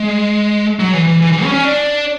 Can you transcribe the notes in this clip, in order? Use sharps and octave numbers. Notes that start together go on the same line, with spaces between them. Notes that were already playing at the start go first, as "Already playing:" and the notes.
Already playing: G#3
F#3
E3
E3
E3
E3
C#4
C#4
D4